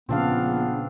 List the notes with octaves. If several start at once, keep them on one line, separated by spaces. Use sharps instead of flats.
A#1 A#2 C#3 B3 C4 D4 F5